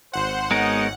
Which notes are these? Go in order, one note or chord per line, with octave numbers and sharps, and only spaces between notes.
G#1 C5 F#5
G#3 B3 C#4 D#4 A#4